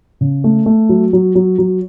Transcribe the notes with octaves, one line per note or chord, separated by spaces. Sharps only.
C#3
A3
A3
F#3
F#3
F#3
F#3